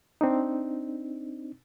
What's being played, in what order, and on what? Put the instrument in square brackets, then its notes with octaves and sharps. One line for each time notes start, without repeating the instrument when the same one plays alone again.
[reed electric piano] C4 D4 D#4